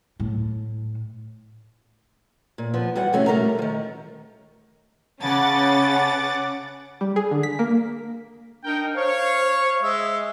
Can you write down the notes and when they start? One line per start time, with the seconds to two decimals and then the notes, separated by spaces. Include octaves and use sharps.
0.20 A2
2.58 A#2
2.74 F3 B3
2.96 E2 G3 F#4 F#5
3.13 F2 C3 A3 C#4 F#4
3.27 G3 A3 A#4 A#5
3.59 D#3 F3
5.21 C#3 B3 C#4 F#5 A5 D6 A6
7.01 G3
7.16 G#4
7.31 D3
7.43 B6
7.59 A#3
8.64 D4 D#4 A#4 G5
8.95 C5 C#5 F5
9.83 G#3 E5